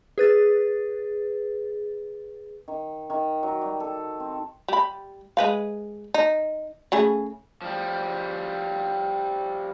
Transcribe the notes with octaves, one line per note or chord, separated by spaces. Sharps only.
G#4 B4 A6
D#3
D#3
F#3
G3
A4
C4
G3 B5
G#3 B4 F5
D#4
C#3 A3 G#4
F3 G3